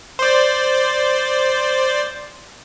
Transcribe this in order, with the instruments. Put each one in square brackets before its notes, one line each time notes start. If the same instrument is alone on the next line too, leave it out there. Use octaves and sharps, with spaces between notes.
[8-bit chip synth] C5 D5